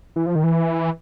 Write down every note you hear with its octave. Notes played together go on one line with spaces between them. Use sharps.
E3
F3
D#3
E3